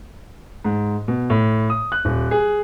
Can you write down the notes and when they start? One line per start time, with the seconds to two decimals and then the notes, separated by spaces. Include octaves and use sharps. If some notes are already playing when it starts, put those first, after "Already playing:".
0.65 G#2
1.08 B2
1.30 A2
1.70 D#6
1.92 F#6
2.05 D#1
2.31 G#4